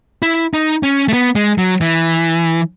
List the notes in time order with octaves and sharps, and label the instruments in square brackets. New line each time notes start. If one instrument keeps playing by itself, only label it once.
[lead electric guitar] E4
D#4
C#4
A3
B3
G#3
F#3
E3